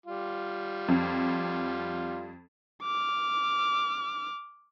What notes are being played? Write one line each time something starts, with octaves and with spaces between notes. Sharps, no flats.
G3 F4
F2
D6 F6